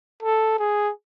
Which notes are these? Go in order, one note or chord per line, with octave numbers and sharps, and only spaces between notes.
A4
G#4